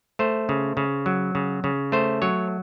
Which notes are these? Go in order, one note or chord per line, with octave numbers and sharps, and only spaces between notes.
A3 C5
C#3
C#3
F#3
C#3
C#3
A3 C5
F#3 C#5